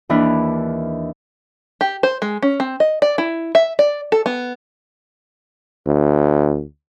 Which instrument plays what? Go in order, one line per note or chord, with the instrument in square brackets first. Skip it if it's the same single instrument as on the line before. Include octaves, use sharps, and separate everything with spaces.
[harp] D#2 E3 D4 E4 B4 F6
[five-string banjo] G4
C5
G#3
C#4
C4
D#5
D5
E4
E5
D5
A4
B3
[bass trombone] D2